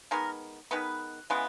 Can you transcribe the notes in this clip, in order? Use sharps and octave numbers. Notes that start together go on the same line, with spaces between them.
D#3 G#3 B3 A#4
D#3 G#3 B3 B4
C#3 E3 G#3 B3